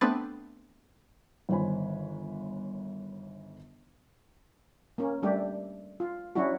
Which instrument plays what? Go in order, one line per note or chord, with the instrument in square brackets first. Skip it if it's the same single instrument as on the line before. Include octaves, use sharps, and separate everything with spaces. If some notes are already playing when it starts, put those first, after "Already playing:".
[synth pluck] A3 B3 C4 D4 B4 A6
[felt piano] G1 D#3 C5 C#5 G#5 B5
[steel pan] A#3 C#4
G3 A3 D4 G4
F4
F#3 C#4 D4 E4 F#4